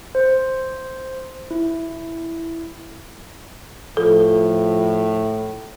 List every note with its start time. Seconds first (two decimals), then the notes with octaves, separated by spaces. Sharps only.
0.15 C5
1.51 E4
3.97 A2 F3 A4